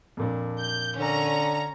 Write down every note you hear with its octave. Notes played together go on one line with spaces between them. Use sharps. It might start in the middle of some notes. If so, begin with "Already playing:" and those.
F2 A#2 D4
G6
D3 C#4 A#5